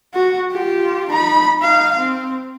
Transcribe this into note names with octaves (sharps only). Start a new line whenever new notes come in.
F#4
F4 G4
D#4 B5
D#4 F5
C4